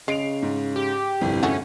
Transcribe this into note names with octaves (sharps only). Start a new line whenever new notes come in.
C#3 G#3 C7 D7 F7
G#2
G4
G1 C2 F2
A3 C#4 F#4 G#4